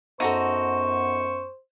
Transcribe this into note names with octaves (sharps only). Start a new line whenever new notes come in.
F#2 B3 D#4 F#4 A4 C5 C#6